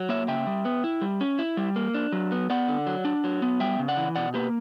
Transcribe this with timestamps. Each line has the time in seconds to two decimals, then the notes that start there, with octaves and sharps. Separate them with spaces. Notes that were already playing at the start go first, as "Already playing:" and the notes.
Already playing: F#3
0.09 A#3 C#5 E5
0.28 C#3 E5 G5
0.47 G3
0.65 B3
0.84 E4
1.01 G3
1.21 C#4
1.39 E4
1.57 G3
1.76 A#3
1.94 D4
2.12 F#3
2.32 B3
2.50 B3 D5 F#5
2.68 D3
2.87 F#3
3.05 D4
3.24 F#3
3.42 B3
3.60 G3 E5 G5
3.79 C#3
3.88 D5 F#5
3.97 E3
4.16 B2 D5 F#5
4.34 A#3 G4 B4